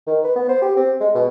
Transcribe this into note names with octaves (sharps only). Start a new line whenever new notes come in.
D#3
B4
B3
C5
G4
C4
G#3
B2